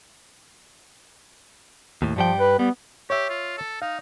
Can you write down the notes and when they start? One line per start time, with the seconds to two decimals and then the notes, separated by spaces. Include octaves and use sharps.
2.02 D#2 A2
2.16 G2 F3 G3 G5
2.40 B4
2.59 G3 B3
3.10 G4 C#5 E5
3.29 F4
3.57 A4
3.82 D#4 F5